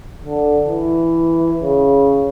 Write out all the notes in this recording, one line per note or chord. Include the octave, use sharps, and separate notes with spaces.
D3
E3
C#3